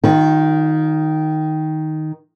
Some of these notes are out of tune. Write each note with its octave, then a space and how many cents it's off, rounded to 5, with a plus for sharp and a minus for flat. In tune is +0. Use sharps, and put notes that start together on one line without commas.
D#3 +5 F4 +40 E5 -45